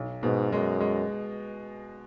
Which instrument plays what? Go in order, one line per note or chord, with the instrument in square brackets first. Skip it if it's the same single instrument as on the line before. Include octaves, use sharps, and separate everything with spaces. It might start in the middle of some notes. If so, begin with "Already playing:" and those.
Already playing: [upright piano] B1
[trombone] G#2 [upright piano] B2
[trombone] F#2 [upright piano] G#3
[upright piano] G#3